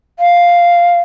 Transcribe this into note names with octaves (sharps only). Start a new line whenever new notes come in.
F5